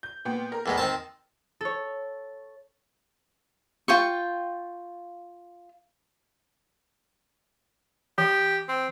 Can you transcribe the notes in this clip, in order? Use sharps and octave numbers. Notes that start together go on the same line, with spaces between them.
G6
A#2 B3 G5
A#4
E2 A2 G#3
D#3 C4 C5 A5
A4 C#5
F4 G5 C#6
E3 G4
C4